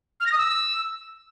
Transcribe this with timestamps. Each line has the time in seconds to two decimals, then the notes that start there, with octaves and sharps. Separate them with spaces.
0.20 F6
0.26 A#6
0.32 D#6
0.38 E6